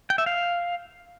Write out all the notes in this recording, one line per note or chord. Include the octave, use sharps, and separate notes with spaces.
G5
E5
F5